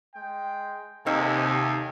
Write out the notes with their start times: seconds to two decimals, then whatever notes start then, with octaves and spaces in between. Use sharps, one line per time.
0.15 G#3 G5
1.06 D#2 C3 D#4 A4 D#5 G#5